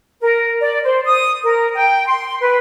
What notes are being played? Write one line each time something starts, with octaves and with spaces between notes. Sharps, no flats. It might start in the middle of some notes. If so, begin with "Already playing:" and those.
A#4
D5
C5
D#6
A#4
G5
C6
B4